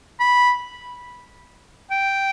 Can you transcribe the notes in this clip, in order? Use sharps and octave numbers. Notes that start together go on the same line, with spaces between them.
B5
G5